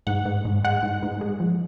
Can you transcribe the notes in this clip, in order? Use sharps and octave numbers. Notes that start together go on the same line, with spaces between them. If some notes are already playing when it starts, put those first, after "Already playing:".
G#2 F#5
G#2
G#2
G#3 F#5
G#2
G#2
G#3
F3